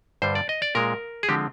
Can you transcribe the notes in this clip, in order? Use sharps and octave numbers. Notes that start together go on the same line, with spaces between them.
G2 D3 G3 C5
D5
D#5
D5
A#2 G#3 C4 A#4
G#4
D3 F3 G#3 C4 G4